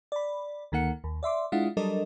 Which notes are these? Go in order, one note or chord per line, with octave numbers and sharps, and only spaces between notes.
D5 B5
D2 D#3 A#3 F#5 C#7
D#2
D5 E5 C6 D6
G#3 D4 E4 F4 F5 F#5
F#3 G3 D4 A4 A#4 D#5